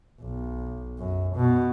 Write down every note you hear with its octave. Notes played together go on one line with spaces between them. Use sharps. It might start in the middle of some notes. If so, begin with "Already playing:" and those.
B1
F#2
B2